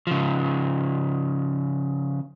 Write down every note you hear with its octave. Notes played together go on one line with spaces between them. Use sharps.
C#3 F3